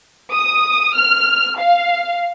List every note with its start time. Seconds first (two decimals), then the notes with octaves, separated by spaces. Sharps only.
0.33 D#6
0.96 F6
1.60 F5